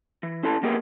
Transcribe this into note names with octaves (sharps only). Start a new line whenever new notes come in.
E3
C#4 E4 A4 A5
A#3 B3 G4 G#4 A#4